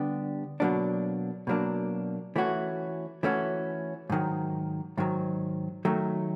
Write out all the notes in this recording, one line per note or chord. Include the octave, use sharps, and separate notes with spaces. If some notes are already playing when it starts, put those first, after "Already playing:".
Already playing: D3 G3 B3 D4 G4
B2 F#3 A#3 D4
B2 F#3 A#3 D4
E3 A3 C#4 F#4
E3 A3 C#4 F#4
G#2 D#3 F#3
G#2 D#3 F#3
D#3 F#3 A3